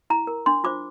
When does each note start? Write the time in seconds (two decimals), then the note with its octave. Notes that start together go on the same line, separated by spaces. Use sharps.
0.10 E4 A#5
0.27 A#4
0.46 D4 C6
0.64 F4 C5 D6